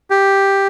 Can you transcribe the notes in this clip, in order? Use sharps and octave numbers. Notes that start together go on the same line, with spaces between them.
G4